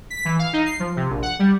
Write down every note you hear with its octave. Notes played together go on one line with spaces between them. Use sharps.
B6
E3
F5
D#4
C7
F3
C3
A#1
F#5
G3